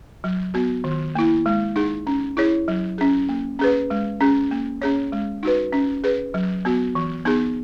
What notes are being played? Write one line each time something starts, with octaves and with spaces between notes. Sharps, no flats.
F#3
B3 F#4
D#3
A#3 E4
G#3
D#4 G#4
C#4
E4 G#4 C#5
F#3
C#4 G#4
A#3
C#4 G#4 B4
G#3
C#4 G#4
A#3
C#4 G#4 C#5
G#3
D#4 F#4 B4
C#4
G#4 B4
F#3
B3 F#4
E3
B3 D#4 G#4